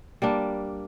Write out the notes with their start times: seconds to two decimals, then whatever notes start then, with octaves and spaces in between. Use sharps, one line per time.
0.22 G3 A#3 D4